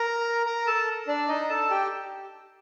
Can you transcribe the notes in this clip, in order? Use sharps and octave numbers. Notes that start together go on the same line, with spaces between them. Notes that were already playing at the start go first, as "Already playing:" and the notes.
Already playing: A#4 A#5
A#4 A#5
A4 A5
D4 D5
D#4 D#5
A4 A5
G4 G5